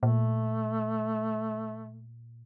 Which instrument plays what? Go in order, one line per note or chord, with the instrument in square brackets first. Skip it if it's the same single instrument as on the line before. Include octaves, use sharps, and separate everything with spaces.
[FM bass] A#2 [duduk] A3